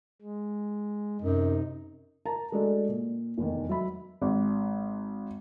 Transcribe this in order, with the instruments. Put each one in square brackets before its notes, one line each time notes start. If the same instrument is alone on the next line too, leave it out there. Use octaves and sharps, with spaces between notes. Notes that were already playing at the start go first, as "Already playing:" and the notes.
[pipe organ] G#3
[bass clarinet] F#2 [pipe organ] C3 D#4
[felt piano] A#4 A5 A#5
G#3 A3 D4 F#4 A4
A#2
F1 E2 D#3
F#3 E5 B5
G#1